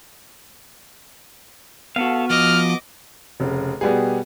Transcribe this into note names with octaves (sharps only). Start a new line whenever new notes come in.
B3 F#4 A4 F5
F3 D#5 D6 F6
F1 C#3
B2 G3 B3 G4 G#4